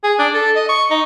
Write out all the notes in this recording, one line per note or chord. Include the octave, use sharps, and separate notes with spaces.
G#4
D4
A4
D#5
C#6
D#4